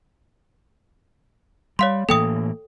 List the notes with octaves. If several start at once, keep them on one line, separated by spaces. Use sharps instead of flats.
G3 C#5 F5 C6
A2 E3 A#3 A4 G5 D#6